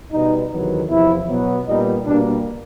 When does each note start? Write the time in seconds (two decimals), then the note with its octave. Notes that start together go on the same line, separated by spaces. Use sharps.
0.12 B2 G3 B3 D#4
0.51 E2 C3 D#3 F#3 B3
0.89 E2 C3 F3 E4
1.28 B2 F#3 B3
1.67 A#2 G3 B3 D#4
2.06 B2 G3 A#3 D4